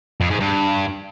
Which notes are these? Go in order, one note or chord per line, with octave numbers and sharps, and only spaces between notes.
F2
G#2
G2